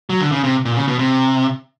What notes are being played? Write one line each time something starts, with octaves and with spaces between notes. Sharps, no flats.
F#3
D3
C#3
C3
A#2
C#3
B2
C3